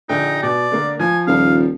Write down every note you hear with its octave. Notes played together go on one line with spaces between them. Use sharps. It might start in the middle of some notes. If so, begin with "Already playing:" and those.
A#1 D3 D#4 G5
B2 D5
D3 A#3
F3 G#5
D#1 F5